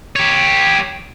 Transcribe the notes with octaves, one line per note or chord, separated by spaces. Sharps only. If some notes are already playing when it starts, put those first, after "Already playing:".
G4 C#5